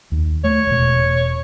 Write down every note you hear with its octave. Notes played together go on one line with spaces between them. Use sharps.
D#2
A3 C#5
E1 B2